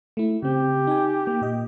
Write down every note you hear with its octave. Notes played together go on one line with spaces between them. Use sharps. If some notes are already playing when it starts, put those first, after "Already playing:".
A3 E4
C#3 C4 G4
D#4 G5 G#5
A#3
A#2 D#5